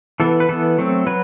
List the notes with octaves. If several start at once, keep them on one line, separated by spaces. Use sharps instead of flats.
E3 B3 A4
B4
E3 B3 A4
F#3 A3 C4
F#3 B4